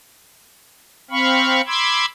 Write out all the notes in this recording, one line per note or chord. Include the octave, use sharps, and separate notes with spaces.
C4 F5 B5 C#6
B5 C6 D6 E6 G#6